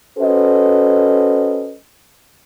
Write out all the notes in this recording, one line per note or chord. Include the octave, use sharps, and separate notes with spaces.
C#4 F#4 A4 B4 C5 D#5